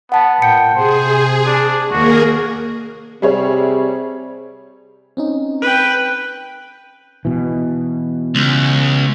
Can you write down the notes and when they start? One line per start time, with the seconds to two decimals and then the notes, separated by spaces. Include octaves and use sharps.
0.12 B3 F#5 A5
0.42 A#2 G5 C#7
0.75 C3 G#4 C5
1.47 D4
1.91 D#2 A#3 F#4 G#4 A#4
3.22 C3 G3 G#4 C#5
5.17 C4 C#4 D#4
5.61 B4 G5
7.25 B2 E3
8.35 C#2